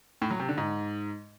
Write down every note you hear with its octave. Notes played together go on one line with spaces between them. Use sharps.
A2
F#3
C3
D3
G#2